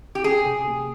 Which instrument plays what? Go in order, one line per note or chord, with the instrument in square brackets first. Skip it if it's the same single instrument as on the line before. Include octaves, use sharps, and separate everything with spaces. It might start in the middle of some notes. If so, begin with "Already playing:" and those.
[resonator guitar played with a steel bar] G4
[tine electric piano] C#4 [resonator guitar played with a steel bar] G#4
[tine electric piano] C3
A#3